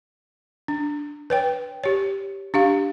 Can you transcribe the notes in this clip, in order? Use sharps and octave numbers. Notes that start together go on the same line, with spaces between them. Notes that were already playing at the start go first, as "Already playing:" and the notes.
D4
B4 C#5 G5
G4 C#5
D4 G4 F5